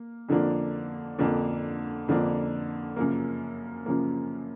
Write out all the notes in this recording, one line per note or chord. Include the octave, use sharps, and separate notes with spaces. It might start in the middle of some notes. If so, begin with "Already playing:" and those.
Already playing: A#3
F2 D3 F3 A#3 D4
F2 D3 F3 A#3 D4
F2 D3 F3 A#3 D4
F#2 C#3 F3 A#3
F#2 C#3 F3 A#3